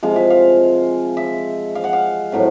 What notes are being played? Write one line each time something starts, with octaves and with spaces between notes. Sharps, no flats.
C3 F3 G#3 F5
E5
F5
E5
F5
F#5
F5
A2 F#3 A3 C4 E5